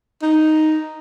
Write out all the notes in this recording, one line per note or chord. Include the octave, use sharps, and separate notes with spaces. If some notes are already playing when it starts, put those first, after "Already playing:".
D#4